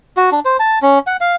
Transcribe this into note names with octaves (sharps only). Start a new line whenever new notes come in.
F#4
D4
C5
A5
C#4
F#5
F5